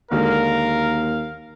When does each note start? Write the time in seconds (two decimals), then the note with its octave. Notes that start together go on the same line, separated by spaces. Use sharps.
0.11 D#2 D3 G#3 F#4 A#4 F5